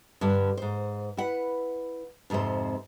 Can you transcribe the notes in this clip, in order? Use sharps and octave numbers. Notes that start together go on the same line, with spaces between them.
G2 D3 G3
G#2 C5
E4 B4 F#5
F2 G#2 C3 C4 C5